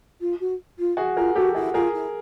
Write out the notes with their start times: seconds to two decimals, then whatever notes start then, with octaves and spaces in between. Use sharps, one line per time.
0.20 F4
0.40 F#4
0.78 F4
0.97 F#4 G#4
1.16 F4 G#4 A#4
1.36 F#4 G4 A4
1.55 E4 F#4 G#4
1.74 F4 G#4 A#4
1.93 E4